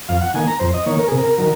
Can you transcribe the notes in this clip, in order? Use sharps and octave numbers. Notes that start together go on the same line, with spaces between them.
F2 F5
F#5
D#3 A#3 G#5
A#5
F2 C5
D#5
D#3 A#3 C#5
A#4
C3 G#4
A#4
D#3 F#3